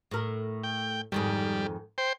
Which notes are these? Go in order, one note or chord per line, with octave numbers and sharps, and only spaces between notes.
A2 A#4
G5
F2 G#2 D#3 G3
C5 G5